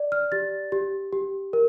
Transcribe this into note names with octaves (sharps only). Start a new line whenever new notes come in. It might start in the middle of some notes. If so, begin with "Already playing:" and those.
Already playing: D5
F6
G4 A6
G4
G4
A#4